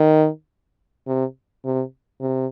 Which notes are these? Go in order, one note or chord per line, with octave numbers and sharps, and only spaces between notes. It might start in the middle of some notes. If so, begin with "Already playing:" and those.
Already playing: D#3
C3
C3
C3